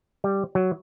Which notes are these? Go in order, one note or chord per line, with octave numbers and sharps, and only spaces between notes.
G3
F#3